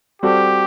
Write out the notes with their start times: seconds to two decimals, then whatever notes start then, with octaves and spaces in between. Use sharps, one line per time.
0.22 G3 C4 F#4 G4 A4